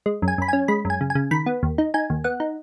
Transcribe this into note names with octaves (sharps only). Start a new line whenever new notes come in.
G#3
F#2
G#5
F#2 B5
C#4 G#5
G#3 B5
F#2
G#5
C#3
G#5
C#3
D#3 B5
B3
D#2
D#4
D#4 G#5
D#2
B3 F#5
D#4